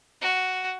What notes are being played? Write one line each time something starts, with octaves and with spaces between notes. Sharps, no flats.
F#4